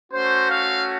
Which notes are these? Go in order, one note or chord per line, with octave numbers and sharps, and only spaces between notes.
A3 C#4 F#4 C5
F5